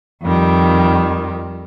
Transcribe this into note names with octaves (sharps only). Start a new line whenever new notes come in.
F2 D#3 G3